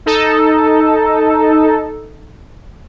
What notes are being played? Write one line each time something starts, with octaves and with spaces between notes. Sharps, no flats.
D#4 A4